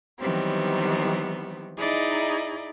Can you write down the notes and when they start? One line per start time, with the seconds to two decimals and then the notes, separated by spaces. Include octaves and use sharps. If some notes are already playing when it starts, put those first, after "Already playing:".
0.19 D#3 E3 F#3 G3 B3 C4
1.78 D#4 E4 G#4 D5 D#5